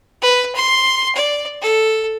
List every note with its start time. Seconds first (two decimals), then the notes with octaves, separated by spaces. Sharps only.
0.22 B4
0.55 C6
1.16 D5
1.62 A4